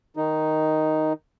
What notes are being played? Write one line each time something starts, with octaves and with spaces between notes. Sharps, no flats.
D#3 D#4